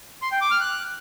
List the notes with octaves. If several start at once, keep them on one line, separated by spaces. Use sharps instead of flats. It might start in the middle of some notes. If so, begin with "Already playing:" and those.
C6
G5
D6
F6
F#6